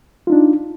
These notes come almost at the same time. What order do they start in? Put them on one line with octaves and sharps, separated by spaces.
F4 D#4 D4